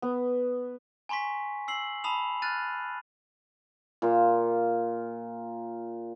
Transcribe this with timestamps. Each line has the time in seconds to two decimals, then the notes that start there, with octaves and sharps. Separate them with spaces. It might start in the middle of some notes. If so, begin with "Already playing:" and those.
0.02 B3
1.09 G#5 A#5 C6 C#6 B6
1.68 E6 C7 F#7
2.04 A5 B5 D#6 F7
2.42 F6 F#6 A6 D#7
4.02 A#2 F4